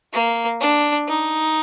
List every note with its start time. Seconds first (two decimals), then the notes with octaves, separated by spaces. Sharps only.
0.13 A#3
0.60 D4
1.08 D#4